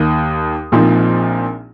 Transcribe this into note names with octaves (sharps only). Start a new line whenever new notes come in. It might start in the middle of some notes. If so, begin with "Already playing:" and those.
Already playing: D#2 D#3 A#3 D#6
A#1 A#2 F3 C4 D#4